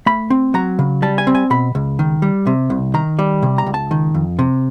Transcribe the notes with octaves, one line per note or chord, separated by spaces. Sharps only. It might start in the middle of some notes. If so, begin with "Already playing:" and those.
A3 B5
C4
F#3 A#5
C#3
G3 A5
G#5
C4
G#5
B2 B5
C#2
D#3
G3
C3
C2
D#3 A#5
G3
C3
A#5
C#2
A5
D#3
F2
C3